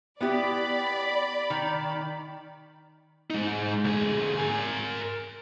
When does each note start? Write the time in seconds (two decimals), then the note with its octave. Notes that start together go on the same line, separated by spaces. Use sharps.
0.21 B3 E4 G4 D5 B5
1.50 D#3
3.30 G#3 D#4
3.85 D2 G#4
4.38 A#4 G#5